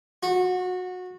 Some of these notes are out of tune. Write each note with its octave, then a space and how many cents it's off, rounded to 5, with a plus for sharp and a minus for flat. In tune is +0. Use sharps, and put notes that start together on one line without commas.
F#4 -20